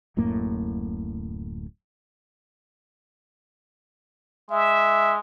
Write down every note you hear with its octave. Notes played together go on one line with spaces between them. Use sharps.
D1 F#2 A2 A#3
G#3 E5